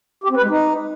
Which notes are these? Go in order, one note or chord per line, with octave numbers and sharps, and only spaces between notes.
G4
C4
B4
G#3
D#4